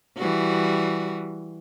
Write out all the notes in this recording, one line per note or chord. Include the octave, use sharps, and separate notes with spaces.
E3 G3 F#4